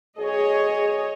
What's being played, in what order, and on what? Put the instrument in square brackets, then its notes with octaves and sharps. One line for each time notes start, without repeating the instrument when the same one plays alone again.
[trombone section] B1 G#4 [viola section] C#5 D#5